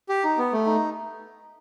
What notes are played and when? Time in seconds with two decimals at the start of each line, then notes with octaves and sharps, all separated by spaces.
0.09 G4
0.24 D#4
0.38 B3
0.53 A3
0.66 D#4